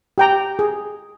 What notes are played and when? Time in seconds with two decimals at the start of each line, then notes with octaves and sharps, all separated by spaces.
0.18 G4 G5 A#5
0.59 G#4